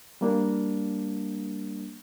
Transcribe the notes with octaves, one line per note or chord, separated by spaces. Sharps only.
G3 A#3 D4